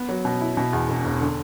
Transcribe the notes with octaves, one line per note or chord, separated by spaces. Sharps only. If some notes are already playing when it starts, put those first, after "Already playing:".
Already playing: B3
F#3
B2
E4
B2
E2
E1
E1
D3